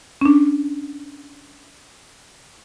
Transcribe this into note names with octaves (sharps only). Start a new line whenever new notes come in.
C#4 D4